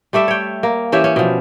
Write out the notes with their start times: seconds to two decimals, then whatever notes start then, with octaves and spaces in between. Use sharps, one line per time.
0.13 G3 A3 D5 E5
0.28 C#5 G5
0.63 A#3
0.92 E3 C#4 G4 E5
1.04 C#4
1.16 B2 F3